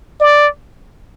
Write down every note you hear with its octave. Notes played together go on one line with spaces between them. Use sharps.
D5